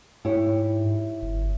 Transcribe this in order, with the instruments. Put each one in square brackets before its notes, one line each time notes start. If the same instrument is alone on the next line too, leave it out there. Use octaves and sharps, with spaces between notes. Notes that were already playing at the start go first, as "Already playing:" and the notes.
[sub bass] G#2 [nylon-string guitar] E4 G4 C#5
[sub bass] G1